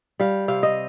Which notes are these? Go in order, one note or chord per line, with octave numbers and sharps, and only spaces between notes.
G3 F5
C3 F5
D#5